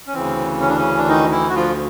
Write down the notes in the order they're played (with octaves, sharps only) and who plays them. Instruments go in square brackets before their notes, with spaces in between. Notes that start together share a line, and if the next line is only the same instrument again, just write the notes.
[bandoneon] C#4
D2 C#3 E3 C4
C#4
D4
C#3 C#4
D4
D#3 D#4
E3 E4
F#4
F3 F4